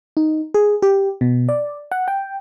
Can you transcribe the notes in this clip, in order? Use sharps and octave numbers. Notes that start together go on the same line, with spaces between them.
D#4
G#4
G4
B2
D5
F#5
G5